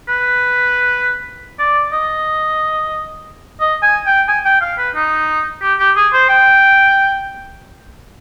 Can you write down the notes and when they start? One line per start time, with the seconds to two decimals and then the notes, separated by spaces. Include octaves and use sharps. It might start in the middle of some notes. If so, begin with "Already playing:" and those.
0.08 B4
1.59 D5
1.93 D#5
3.60 D#5
3.83 G#5
4.06 G5
4.28 G#5
4.45 G5
4.61 F5
4.78 B4
4.95 D#4
5.62 G4
5.79 G4
5.96 G#4
6.13 C5
6.29 G5